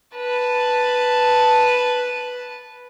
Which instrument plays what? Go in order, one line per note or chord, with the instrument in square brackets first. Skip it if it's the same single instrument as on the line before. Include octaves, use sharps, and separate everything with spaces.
[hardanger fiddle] B4 A5